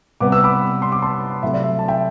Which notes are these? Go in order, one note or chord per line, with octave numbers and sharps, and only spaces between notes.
C3 G3 B3 D6
E6
B5 D6
C6
D6
A5 C6
C3 F#3 A3 E5
D5
E5
A5
E5 G5